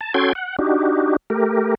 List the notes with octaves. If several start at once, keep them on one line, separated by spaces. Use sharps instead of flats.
A5
C#4 F#4 A4 G5 C6 G#6
F#5
D4 D#4 F#4 G4
A3 G4 A#4